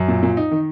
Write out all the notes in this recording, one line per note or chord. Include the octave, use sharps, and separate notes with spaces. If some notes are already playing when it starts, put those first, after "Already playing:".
Already playing: F#2
A#2
A#2
D#4
D#3